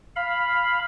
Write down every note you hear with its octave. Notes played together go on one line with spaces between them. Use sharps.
F5 B5